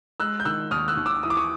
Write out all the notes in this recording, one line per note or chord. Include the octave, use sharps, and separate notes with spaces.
G#3 E6 F#6
G6
D#3 E6 F#6
D#2 D#6 F6
E6 F#6
D#2
D6 E6
E3 D#6
D6
C#6 D#6